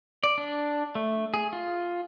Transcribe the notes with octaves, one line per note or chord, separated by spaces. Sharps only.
D5
D4
A3
G#4
F4